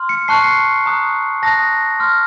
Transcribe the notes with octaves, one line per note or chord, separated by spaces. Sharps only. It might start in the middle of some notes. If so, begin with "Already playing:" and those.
Already playing: C6 F6
C#7
A5 C#6 F#6 C7
C#7
C7
A#5 D#6 F#6
A5 D#6 F#6 A#6
C6 F6